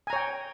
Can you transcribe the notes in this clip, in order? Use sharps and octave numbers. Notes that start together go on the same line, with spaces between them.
C#5 G5 G#5 A#5